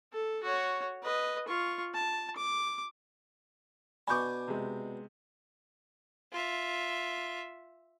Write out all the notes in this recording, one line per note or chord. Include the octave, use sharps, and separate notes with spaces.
A4
F#4 C#5
B4 D#5
F4 C#6
A5
D6
B2 D4 G#5 B5 C#6 D6 G6
C3 G#3
F4 E5